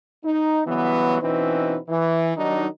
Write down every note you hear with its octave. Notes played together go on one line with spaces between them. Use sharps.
D#4
C#3 E3 F#3 G3 B3
B2 E3 C4 C#4 D#4 B4
E3
D#3 F#3 G3 D4 D#4